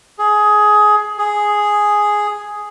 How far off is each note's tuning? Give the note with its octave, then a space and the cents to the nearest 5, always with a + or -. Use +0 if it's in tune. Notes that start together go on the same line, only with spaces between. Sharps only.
G#4 +15
G#4 +0